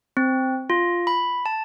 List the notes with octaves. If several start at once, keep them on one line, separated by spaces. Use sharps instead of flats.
C4
F4
B5
A5